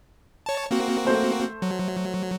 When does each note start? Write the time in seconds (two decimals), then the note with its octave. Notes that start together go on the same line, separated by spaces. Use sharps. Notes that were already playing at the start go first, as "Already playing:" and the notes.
0.46 C#5 A5
0.71 A#3 C4 F#4
1.07 A3 C5
1.62 F#3